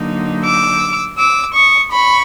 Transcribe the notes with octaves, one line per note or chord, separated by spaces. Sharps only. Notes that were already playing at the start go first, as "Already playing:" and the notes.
Already playing: D3 F#3 A#3 D#4
D6 E6
D6 E6
C#6 D#6
B5 C#6